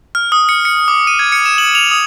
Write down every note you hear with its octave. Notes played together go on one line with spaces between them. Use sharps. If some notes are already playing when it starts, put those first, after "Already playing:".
F6
D#6
C#7
C#7
D6
D#7
G#6
C#7
E7
F#7
F7
D#6